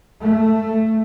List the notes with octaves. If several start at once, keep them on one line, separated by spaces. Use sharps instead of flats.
A3